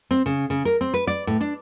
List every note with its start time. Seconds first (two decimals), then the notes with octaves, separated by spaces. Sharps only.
0.11 C4
0.26 C#3
0.50 C#3
0.65 A#4
0.81 C4
0.94 B4
1.07 D5
1.27 A2
1.41 D4